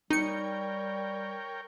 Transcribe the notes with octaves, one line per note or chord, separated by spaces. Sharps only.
G3 D#4 A#4 C#5 G5 C#7